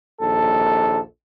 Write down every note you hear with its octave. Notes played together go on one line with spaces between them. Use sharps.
A#1 D#2 A4